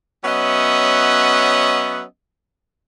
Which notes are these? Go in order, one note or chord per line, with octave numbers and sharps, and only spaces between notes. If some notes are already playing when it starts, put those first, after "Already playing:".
F#3 B3 C#4 D#5 E5 F#5